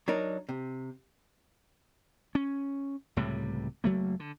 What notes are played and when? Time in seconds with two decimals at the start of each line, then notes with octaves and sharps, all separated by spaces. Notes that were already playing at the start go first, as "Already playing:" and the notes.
0.08 F#3 D4 D#4 A#4
0.49 C3
2.35 C#4
3.17 C#2 A2 C3 G3
3.84 F#1 F#3 A3 A#3
4.20 D3